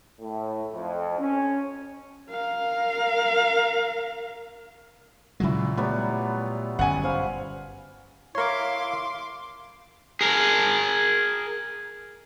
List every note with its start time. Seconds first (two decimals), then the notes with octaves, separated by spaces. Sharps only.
0.21 A2
0.72 F2
1.19 C#4
2.31 A#4 F5
5.40 A#2 C#3 F#3 G#3 E4 F#4
5.77 F#3 G3 A3 B3
6.79 G1 F#2 C#4 F#5 G#5
7.04 C5 F5 B5
8.35 E4 A#4 C#5 F5 C6 D6
10.21 G#4 A#4